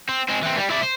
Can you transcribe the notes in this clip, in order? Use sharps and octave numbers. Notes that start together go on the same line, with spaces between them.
C4
G#3 C4
E3 C4
G3
E4 D5
C5